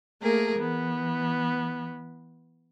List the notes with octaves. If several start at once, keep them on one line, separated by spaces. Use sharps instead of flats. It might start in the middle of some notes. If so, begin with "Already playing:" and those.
A3 A#3 G#4 A#4
E3 B3